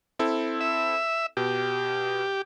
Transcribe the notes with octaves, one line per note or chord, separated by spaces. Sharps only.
C4 E4 A4
E5
B2 G4